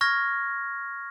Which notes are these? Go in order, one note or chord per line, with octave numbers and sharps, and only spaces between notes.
C#6 F6 G#6 A#6